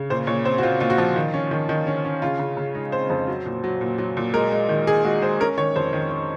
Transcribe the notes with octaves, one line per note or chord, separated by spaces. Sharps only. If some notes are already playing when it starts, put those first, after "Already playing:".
Already playing: C#3
A#2 C5
A#2 C#5
C4 C5
F#4
C4 F4
A#2 F4
F#4
F3 F4
D#3
C#4
D#3
D#3
C#4
C#4
C#3 F4
C#3
C#3
G#3 D#4
C4 C5
F2 C5
F#3
A#2
F#3
A#2
F#3
A#2
G#3 A#4
G#3
D#3
G#3 G#4
G#3 F#4
G#3 C5
C#4 A#4
D#3 C#5
F2 C5
D#3
D#3